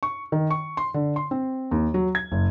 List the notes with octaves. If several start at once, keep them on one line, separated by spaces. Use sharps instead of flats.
C#6
D#3
C#6
C6
D3
C6
C4
D#2
F#3
G#6
F#1